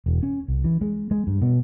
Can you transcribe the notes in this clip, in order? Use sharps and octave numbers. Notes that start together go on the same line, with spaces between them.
E1
C#4
C2
E3
G#3
G#3
G2
B2